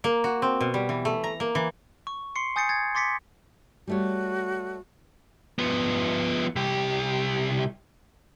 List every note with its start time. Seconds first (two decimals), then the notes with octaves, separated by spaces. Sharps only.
0.04 A#3
0.24 F#4
0.42 C4
0.61 B2
0.74 G3
0.89 E3
1.05 A3
1.24 A#5
1.40 A#3
1.55 E3
2.07 C#6
2.36 C6 C7 C#7
2.56 G#5 D#6 G6 A6 C7 C#7
2.69 G#6 A6
2.95 C6 D6 A6 B6 C#7
3.87 G3 A3 F#4 C#5
5.59 F3 B3
6.56 C2 G4